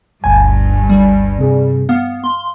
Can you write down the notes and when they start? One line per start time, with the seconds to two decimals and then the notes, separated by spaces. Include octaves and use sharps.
0.24 G1 D2 G2 G#5
0.89 G3
1.39 C3 G#4
1.89 B3 F5
2.24 C6